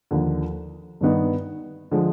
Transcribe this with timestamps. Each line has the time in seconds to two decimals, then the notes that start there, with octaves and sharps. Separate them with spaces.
0.11 D#2 D3 F3
1.01 G2 D#3 B3 D#4
1.91 D3 F3 G#3